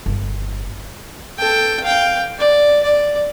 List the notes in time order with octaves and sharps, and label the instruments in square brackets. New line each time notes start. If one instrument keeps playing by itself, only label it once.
[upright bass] G1
[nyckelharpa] A4 G5
F5 G5
D5
D5